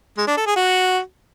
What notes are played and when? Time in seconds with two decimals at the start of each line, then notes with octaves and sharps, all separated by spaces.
0.17 G#3
0.27 D4
0.37 A4
0.47 G#4
0.56 F#4